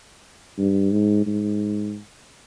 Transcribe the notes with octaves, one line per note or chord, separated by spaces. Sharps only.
G2
G#2
G#2